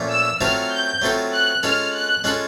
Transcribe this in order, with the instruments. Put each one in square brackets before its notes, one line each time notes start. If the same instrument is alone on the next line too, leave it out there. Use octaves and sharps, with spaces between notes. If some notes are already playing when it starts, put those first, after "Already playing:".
Already playing: [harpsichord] A#2 F3 A3 C#4
[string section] E6
[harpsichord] F#3 A3 C4 F4 A4 [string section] F6
[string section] G6
[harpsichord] F#3 A3 C4 F4 A4
[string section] F#6
[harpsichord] G#3 C#4 F4 A4 [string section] F6
[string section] F#6
[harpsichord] G#3 C#4 F4 A4